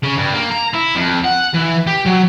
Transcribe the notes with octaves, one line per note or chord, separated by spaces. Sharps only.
C#3
G2
A#3
A#5
E4
F2
F#5
E3
G4
F#3